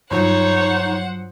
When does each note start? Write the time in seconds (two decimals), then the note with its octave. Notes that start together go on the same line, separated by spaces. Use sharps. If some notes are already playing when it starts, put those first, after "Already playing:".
0.11 G2 F3 F#3 D#4 C5 C#5 F#5